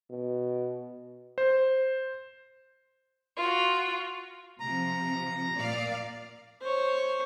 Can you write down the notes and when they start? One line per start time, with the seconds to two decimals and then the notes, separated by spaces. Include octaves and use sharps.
0.10 B2
1.38 C5
3.37 F4 F#4
4.60 C3 F3 A#5
5.56 A#2 D5 F5
6.61 C5 C#5